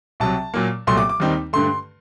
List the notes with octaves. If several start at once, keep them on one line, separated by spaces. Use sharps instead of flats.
C2 C3 F#3 A5
A#2 F#3 A#3
C2 A#2 F#3 A3 C6
D6
D6
D#2 D#3 G3 C4 D#4
G2 D3 A3 C6